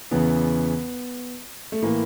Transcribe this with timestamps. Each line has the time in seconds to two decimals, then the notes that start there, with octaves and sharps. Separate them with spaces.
0.11 E2 C#3 E3 B3
1.72 A3
1.82 A2 E3 A#3